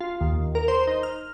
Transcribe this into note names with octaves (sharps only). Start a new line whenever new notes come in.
F4
D#2
A#4
C5
D#4
F6